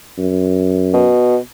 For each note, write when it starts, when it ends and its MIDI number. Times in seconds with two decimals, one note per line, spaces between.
0.18 1.11 42
0.94 1.38 47